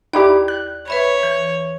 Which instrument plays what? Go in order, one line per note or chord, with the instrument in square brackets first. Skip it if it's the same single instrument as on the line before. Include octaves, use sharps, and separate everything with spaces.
[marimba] D#2 D5 B5 [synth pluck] D#4 E4 G4
[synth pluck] F#6
[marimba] B4 E5 B5 [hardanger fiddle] C#5
[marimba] E3